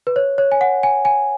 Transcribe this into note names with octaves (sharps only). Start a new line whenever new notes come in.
B4
C#5
C#5
G#5
F#5
G#5
G#5